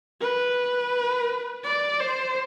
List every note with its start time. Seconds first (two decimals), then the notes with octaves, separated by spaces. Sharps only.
0.21 B4
1.64 D5
2.00 C5